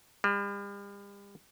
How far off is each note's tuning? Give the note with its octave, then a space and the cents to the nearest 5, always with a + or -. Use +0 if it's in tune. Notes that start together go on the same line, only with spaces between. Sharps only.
G3 +40